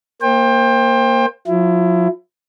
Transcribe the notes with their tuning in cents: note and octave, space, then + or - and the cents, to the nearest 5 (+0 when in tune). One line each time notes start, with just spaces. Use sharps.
A#3 +0 C5 +25 G5 +25
F3 +45 E4 +25